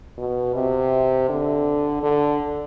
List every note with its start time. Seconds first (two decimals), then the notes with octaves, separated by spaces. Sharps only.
0.18 B2
0.55 C3
1.29 D3
2.03 D3